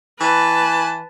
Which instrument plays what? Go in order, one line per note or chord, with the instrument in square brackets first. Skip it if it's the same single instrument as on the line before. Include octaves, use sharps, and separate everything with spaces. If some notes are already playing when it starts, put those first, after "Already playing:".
[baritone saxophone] E3 [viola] B4 A5